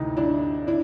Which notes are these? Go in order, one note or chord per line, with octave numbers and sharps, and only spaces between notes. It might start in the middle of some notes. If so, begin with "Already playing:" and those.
Already playing: D2 C3 E3 D#4
D4 E4
D4 E4